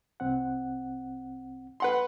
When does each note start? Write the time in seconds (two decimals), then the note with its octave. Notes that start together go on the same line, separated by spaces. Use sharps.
0.20 C2 C4 F#5
1.80 B4 F#5 C6